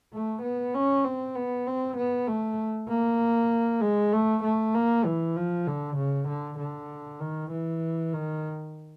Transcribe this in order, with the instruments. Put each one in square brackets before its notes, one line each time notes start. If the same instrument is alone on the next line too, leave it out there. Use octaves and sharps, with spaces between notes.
[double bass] A3
B3
C#4
C4
B3
C4
B3
A3
A#3
G#3
A3
A3
A#3
E3
F3
D3
C#3
D3
D3
D#3
E3
D#3